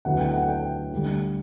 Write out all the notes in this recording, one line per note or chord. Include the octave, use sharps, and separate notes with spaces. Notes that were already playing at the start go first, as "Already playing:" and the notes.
D2 D3 F#3 B3 E4 F#5
G5
F#5
G5
D2 D3 G3